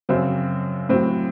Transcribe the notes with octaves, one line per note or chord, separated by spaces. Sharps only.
F#2 C#3 F#3 C4
A2 F#3 C4